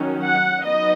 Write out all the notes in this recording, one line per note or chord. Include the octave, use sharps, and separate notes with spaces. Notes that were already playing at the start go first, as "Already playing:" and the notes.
Already playing: D#3 F#3 C#4
F#5
F#3 B3 D#4 D#5